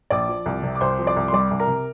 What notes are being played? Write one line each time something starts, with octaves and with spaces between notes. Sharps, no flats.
A#1 D5 D6
F3
C2
C3
D6
C2 C5 C6
F3
D5 D6
C2
C6
G3 D5 D6
C2
A#4 A#5
C3